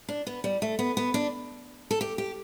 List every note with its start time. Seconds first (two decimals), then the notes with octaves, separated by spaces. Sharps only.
0.09 D4
0.27 B3
0.44 G3
0.62 A3
0.79 B3
0.97 B3
1.14 D4
1.91 A4
2.01 G4
2.18 G4